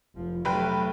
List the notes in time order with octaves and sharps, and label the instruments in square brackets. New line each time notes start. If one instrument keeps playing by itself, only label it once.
[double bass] F1 F3
[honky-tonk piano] F1 B4 G5 [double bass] F#3 A3